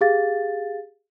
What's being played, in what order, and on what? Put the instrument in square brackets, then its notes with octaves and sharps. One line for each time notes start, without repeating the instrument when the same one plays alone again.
[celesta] G4 G#4 F5 A6